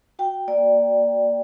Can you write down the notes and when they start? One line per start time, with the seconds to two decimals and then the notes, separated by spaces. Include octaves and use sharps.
0.19 F#4 G5
0.48 A#3 D5